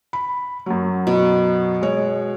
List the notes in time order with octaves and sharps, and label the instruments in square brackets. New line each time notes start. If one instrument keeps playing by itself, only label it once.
[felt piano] B5
F#2 F#3
[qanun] B2
[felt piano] G#3 C#5